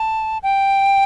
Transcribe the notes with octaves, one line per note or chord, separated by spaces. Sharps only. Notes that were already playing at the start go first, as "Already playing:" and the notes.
Already playing: A5
G5